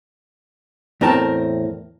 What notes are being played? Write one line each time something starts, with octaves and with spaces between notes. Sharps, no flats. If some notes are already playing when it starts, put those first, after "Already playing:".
E2 A2 C4 A#4 G5 A5